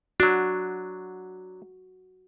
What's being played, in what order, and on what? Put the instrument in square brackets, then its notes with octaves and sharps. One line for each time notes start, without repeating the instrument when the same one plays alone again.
[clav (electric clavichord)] F#3 D4 [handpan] F#4